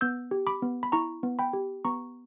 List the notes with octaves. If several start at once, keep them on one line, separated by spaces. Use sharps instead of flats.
B3 E6 G6
G4
B5 D6
B3
B5
E4 A#5 C#6
B3
G5 B5
G4
B3 A#5 C#6